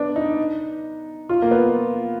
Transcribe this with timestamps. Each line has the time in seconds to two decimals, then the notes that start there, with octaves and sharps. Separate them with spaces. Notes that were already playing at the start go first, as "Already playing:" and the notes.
Already playing: B3 D4
0.16 D#4
1.29 F4
1.42 A#3
1.51 B3